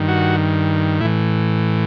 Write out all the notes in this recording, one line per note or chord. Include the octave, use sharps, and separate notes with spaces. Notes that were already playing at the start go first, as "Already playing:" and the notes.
Already playing: G2 D#3
F#4
A2 E3 E4